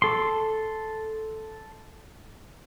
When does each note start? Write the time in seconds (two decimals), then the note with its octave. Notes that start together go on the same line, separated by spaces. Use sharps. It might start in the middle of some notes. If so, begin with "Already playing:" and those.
0.02 A4 C6